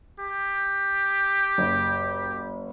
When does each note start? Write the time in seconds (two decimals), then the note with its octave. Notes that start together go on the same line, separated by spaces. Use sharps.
0.19 G4
1.58 F#1